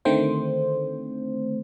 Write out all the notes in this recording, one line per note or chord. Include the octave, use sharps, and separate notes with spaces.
D3 D#3 A3 C4 C5